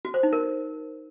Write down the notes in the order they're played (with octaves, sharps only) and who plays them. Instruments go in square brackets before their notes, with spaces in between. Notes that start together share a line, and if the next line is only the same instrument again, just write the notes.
[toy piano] F#4
C5
D#4
A#4